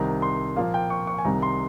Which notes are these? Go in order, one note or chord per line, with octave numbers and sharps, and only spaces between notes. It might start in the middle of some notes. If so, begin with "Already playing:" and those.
Already playing: C2 C3 D#3 A#5
C6
A#2 F3 A#3 F5
G5
C#6
C#6
G#5
C2 C3 D#3 A#5
C6